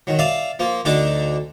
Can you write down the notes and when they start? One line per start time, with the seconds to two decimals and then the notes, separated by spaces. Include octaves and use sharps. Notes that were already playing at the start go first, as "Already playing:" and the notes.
0.07 D#3 F#3
0.19 D5 E5 F5 D#6
0.59 F3 A#3
0.85 D2 D3 D4 D#4 D5 D6